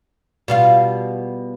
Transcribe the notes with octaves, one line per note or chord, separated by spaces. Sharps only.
B2 G3 F4